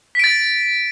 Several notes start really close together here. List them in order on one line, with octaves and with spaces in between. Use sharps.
B6 D7 A6